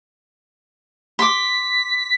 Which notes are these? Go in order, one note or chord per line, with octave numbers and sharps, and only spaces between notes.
C6 D6 B6